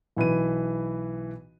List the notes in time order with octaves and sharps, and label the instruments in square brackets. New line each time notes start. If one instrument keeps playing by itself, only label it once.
[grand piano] B1 E3 B4 D#7